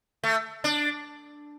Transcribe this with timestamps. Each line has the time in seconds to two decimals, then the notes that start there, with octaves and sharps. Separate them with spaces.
0.24 A3
0.64 D4